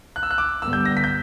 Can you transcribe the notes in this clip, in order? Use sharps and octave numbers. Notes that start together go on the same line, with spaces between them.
F#6
E6
F#6
D6
G2 D3 G3 B3 E6
G6
A#6
B6
G6